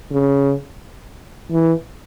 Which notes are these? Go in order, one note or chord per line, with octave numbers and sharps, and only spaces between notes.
C#3
E3